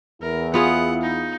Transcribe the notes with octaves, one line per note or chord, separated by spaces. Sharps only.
E2 E4 A#4
B3 F4 G#4 F#5
D#4